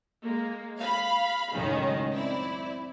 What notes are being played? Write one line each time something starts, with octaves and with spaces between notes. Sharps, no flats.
G#3 A#3
F5 B5
C#2 F#2 A2 D#3 C#4
C4 E4 D5